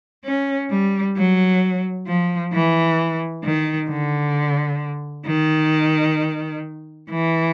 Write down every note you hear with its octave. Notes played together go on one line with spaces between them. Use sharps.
C#4
G3
F#3
F3
E3
D#3
D3
D#3
E3